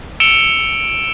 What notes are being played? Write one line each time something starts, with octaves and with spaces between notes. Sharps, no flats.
E6 C#7 D7 E7 F7 G7